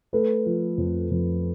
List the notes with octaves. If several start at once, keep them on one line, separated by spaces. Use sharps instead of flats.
A3 A4 B4
F3
F2
F2